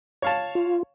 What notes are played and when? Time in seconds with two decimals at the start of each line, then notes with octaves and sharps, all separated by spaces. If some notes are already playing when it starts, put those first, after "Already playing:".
0.22 C#5 F5 A5
0.55 F4